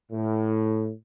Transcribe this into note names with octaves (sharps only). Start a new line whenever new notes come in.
A2